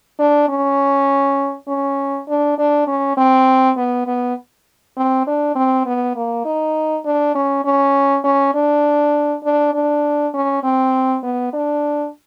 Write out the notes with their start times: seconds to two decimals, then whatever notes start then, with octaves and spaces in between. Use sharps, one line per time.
0.19 D4
0.49 C#4
1.68 C#4
2.28 D4
2.58 D4
2.87 C#4
3.17 C4
3.76 B3
4.07 B3
4.97 C4
5.27 D4
5.55 C4
5.86 B3
6.15 A#3
6.45 D#4
7.05 D4
7.35 C#4
7.65 C#4
8.24 C#4
8.54 D4
9.44 D4
9.74 D4
10.34 C#4
10.63 C4
11.23 B3
11.53 D4